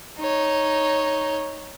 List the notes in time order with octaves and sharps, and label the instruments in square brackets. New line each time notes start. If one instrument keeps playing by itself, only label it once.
[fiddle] D#4 C#5